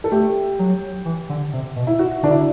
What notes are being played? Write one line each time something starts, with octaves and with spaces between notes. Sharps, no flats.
A4
A3 G4
F#3
E3
D3
C3
B2
E4
F#4
D3 D4
E4